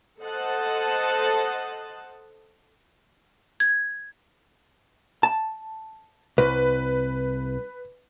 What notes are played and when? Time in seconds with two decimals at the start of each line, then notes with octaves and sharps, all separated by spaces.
0.21 A4 C5 D#5 F#5 A5
3.60 G#6
5.23 A5
6.38 C2 B4